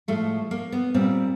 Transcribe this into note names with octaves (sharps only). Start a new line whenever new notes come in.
A2 F3 G#3 A3
A#3
B3
A#2 G3 C4